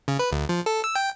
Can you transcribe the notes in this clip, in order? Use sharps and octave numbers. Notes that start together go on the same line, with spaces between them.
C#3
B4
D2
F3
A4
E6
G5